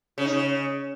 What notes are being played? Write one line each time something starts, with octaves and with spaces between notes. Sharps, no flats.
C#3
D#4
C#3